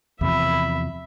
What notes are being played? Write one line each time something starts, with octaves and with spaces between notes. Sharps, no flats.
E2 C3 F3 E5 B5